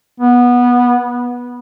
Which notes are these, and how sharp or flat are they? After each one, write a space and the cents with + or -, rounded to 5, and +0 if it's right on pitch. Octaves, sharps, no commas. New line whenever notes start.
B3 -15